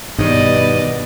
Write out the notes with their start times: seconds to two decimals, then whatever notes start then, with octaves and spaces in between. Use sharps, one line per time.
0.18 G2 B2 D#3 B3 D5 D#5